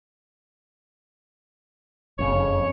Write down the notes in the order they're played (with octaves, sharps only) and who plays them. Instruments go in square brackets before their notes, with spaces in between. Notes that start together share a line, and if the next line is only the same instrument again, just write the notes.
[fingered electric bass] F#1 F2 C#3 [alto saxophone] C#5